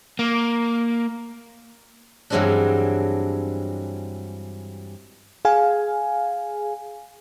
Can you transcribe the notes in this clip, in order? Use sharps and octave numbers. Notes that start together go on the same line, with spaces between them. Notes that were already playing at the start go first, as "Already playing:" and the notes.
A#3
G2 E3 F#3 G#3 C4 D4
G#4 F5 G#5